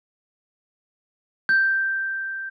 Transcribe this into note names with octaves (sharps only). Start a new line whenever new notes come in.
G6